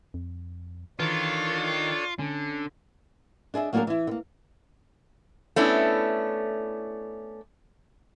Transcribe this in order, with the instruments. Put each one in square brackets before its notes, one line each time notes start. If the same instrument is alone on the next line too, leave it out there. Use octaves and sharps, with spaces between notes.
[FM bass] F2
[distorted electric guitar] D#3 [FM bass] E3 [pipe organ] D4 A4 C#5 [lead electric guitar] F4
[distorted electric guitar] D3 [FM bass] C#4
[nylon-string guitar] D4 G#4 D#5 E5
F#3 A#3 D4 F#4 G#4 A#4
E3 E4
D3 A#3
[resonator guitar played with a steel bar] A3 B3 C#4 D4 E4